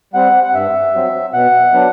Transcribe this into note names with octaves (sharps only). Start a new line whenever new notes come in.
G3 C4 F#5
F#5
G2 E5
F#3 C4
B2 F#5
F#3 B3 D4